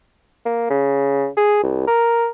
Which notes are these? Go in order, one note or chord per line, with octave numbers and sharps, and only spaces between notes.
A#3
C#3
G#4
C2
A#4